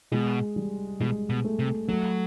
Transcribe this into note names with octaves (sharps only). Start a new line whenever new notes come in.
B2 G#3
G3
B2 G#3
B2
A3
C3
F#3 A3